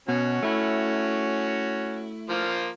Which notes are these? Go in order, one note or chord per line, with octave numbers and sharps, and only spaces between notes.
B2 C#4 F#4
A3 E4
F3 A#3 F4